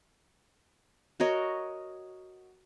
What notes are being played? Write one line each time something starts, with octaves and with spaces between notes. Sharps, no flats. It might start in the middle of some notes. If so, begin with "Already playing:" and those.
F#4 A#4 C#5 D#5